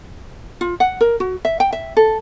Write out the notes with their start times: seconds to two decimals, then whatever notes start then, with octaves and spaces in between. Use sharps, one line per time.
0.61 F4
0.80 F#5
1.01 A#4
1.20 F#4
1.45 E5
1.60 G5
1.73 E5
1.97 A4